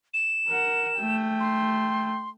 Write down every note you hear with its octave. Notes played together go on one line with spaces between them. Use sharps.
E7
A#4 F#5
A3 G5
C6